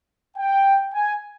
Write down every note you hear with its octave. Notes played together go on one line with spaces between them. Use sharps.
G5
G#5